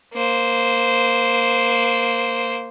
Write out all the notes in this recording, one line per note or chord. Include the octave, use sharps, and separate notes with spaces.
A#3 C5